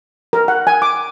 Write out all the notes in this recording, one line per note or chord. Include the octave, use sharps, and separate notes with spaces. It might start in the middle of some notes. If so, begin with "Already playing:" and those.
A#4
F#5
G#5
D6